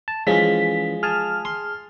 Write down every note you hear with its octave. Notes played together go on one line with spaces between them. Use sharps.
A5
E3 F3 G#3 C#4 B6
G#4 G#5 A5 F6
C6